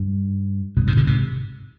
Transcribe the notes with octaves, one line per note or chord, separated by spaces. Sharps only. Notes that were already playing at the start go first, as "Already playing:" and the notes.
Already playing: G2
G2 B2
G#2 C3
B2 D3
G#2 C3